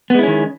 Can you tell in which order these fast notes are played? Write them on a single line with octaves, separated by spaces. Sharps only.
B3 G#3 E4 C#4 D#3